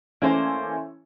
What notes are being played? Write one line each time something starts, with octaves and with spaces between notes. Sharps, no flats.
E3 A3 A#3 C#4 C5 D5